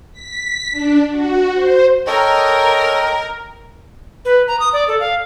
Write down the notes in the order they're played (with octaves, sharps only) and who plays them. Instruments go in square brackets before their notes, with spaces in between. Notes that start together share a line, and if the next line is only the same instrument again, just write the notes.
[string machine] B6
D4
F#4
C5
[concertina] A4 C#5 [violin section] A#4 [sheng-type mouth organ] D#5 G5
[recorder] B4
A#5
D#6
D5
A4
F5